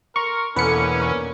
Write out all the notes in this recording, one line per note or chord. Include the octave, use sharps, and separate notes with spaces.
A#4 C6 C#6
E2 B2 D3 A#3 C#4 B4 C#7
A#4 C#5